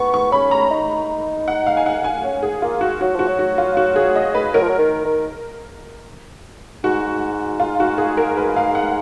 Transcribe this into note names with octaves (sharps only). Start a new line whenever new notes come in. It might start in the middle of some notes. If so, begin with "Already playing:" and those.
Already playing: B3 C#6
C#6
C#4 B5
A#5
D#4
F#5
F5
G#5
F#5
G#5
C#4
G#4
A#3 F4
F#4
F#3 F#4
F3 F#4
F#3
F#4
F4
F#4
G#4
D#5
B4
F#3 A#4
F3
F#3
D#3
D#3
G#2 F#4
F4
F#4
G#4
A#4
B4
F5
F#5